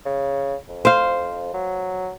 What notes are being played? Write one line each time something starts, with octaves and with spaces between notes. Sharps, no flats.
C#3
F2
C5 F5
F#3